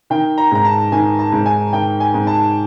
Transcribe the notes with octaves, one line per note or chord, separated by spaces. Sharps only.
D#3 G5
A#5
G#2 A#5
A5
D#3 G#5
A5
G#2
G#5
D#3 G5
G#5
G#2
A5